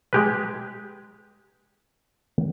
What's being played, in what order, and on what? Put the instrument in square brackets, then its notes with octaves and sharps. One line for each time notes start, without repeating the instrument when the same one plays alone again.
[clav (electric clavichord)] G#3 G4 B4